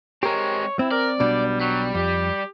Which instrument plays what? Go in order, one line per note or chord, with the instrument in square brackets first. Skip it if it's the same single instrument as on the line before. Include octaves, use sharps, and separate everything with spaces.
[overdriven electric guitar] G#3 C4 [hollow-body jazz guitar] G4 A#4 [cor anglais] C#5
[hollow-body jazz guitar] C4 [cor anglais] E4
[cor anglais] A#4 [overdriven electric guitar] D5
[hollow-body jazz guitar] B1 B2 D4 [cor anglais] G3
[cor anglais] F#3 [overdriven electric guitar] G3
[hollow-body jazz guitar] F2 [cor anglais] G4